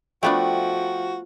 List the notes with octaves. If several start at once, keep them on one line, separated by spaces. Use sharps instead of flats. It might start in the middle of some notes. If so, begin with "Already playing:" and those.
F3 A3 B3 D4 F#4 E5 F5 G5